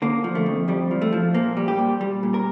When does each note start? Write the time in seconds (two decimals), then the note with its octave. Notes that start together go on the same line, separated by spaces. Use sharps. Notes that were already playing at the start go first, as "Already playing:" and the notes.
0.02 D3 A#3
0.24 F3
0.35 A3
0.46 F2
0.68 F2 G3
0.91 F3
1.02 A3
1.12 F3
1.34 A#2 A#3
1.57 G3
1.68 G4
1.79 A#2
2.01 G3
2.23 A#2
2.34 A#4